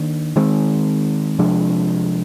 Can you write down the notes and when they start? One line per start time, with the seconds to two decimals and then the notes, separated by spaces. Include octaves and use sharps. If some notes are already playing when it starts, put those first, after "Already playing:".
Already playing: D#3 A#3 D4
0.36 D#3 G#3 C4
1.39 C3 F3 G#3 D4